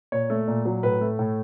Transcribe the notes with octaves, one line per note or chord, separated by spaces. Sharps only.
A#2 C#5
A3
A#2
F#3
A2 B4
A3
A2